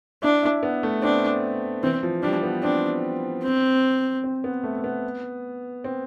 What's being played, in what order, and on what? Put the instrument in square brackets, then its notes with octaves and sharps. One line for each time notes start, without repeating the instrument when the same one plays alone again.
[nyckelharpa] D4 [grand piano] E4
[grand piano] E4
B3
A3
[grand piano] C4 [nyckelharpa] D4
[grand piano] E3 [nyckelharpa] C4
[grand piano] F3
[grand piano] G3 [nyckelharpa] D4
[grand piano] B3
[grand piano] C4 [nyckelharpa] D4
[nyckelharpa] C4
[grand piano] C4
B3
A3
A3
B3
C4